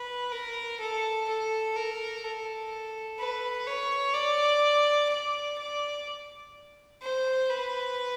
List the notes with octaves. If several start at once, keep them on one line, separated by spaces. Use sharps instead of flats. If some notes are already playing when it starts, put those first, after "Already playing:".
Already playing: B4
A#4
A4
A4
A#4
A4
B4
C#5
D5
D5
D5
C5
B4